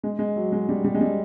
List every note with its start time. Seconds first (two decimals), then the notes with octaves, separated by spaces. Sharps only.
0.03 G#3
0.19 G#3
0.36 F#3
0.52 G#3
0.69 G3
0.84 G3
0.94 G#3
1.01 G3